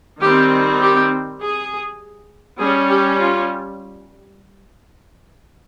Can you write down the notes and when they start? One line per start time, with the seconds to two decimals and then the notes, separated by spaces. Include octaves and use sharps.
0.20 D#3 G3 C4 G4
0.81 G4
1.40 G#4
2.59 G3 C#4 G#4
2.89 G4
3.19 F4